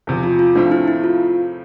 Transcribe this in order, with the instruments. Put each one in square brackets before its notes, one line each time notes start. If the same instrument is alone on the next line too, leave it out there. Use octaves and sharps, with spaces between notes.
[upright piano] E2 C3 F3
[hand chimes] F4
F4
[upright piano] A2 F3 A3 C4 F4 [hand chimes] D4
[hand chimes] E4
E4
F4